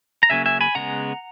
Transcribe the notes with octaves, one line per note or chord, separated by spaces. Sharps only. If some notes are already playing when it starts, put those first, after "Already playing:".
A#5
C#3 F#3 A#3 C#4 E5 G#5
E5 G#5
G#5 B5
C#3 G#3 B3 F#5 A#5